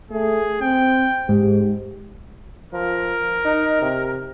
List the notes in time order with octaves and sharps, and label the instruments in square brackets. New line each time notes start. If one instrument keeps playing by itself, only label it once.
[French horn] A3 [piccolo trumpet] G#4
[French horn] C4 [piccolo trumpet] G5
[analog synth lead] G#2 [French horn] G4
[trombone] F3 [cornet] A#4
[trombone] D#4
C3